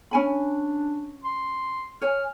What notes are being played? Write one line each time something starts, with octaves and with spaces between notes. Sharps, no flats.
C#4 D4 G#5 B5
C6
C#5 G#5 F6